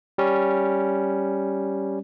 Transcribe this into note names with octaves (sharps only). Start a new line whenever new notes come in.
G3 C#4